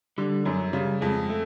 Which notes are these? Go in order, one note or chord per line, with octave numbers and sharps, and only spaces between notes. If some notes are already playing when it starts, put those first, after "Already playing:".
D3 G3
F#2 F#3
C#3 G3
F2 G#3
A3